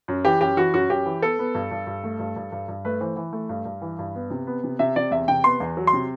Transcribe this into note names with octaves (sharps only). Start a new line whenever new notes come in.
F#2
E3 G4
F#2 G4
E3 F#4
F#2 F#4
F#2 G4
E3
B3 A4
B3
G2
G2
G2
A3
G2
G2
G2
G2
A3 B4
E3 C5
E3
A3
G2
G2
E3
G2
B3
C3
B3
C3
C3 E5
C3 D5
E2 E5
C3 G5
B3 C6
E2
F#3
C6
C3